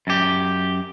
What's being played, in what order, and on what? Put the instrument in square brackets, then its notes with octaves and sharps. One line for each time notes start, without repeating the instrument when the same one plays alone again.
[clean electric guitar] F#2 G4